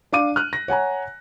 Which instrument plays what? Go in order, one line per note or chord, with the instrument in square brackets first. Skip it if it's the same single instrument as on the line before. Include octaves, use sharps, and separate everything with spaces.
[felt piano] D4 F5 D6 D#7
F6 F#6
A#6
C#5 F#5 G#5 A#5